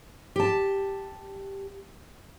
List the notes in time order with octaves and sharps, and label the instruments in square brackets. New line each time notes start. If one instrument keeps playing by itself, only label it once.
[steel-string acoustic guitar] G4 A5